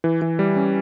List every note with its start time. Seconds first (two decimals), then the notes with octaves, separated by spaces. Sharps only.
0.04 E3
0.22 E3
0.39 G3
0.56 C#4